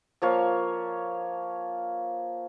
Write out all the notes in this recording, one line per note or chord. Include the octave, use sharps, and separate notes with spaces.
F3 A#3 C#5 F5